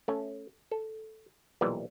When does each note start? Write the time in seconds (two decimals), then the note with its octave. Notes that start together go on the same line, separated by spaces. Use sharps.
0.08 A3 C#4
0.71 A4
1.61 B1 A#2 E3 G3